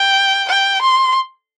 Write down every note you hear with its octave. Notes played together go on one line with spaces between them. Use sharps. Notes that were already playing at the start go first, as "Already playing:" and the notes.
Already playing: G5
G5
C6